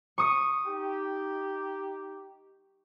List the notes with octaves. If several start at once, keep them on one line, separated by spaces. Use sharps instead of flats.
C#6 D#6 C#7
D#4 G4